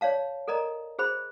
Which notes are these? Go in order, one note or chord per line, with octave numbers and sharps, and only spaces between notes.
C#5 D5 F5 A5
A4 A#4 D5 D#5 A#5
G#4 C5 B5